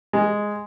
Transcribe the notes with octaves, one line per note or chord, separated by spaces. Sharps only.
G#3